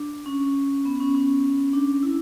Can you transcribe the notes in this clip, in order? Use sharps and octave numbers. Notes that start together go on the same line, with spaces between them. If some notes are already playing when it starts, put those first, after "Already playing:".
Already playing: D4
C#4
B3
C#4
C#4
D4
E4